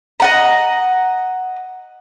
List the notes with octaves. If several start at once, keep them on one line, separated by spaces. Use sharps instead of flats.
D#5 F#5 A#5